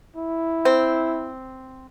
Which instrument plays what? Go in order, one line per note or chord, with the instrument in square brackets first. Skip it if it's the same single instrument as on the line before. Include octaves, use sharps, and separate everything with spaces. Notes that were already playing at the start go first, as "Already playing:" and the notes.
[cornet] E4
[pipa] C4